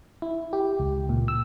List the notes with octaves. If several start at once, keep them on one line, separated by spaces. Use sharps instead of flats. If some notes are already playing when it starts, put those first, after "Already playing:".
E4
G4
C#2
A#2
E6